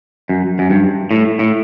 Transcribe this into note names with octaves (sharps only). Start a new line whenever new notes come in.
F#2
F#2
G2
A2
A2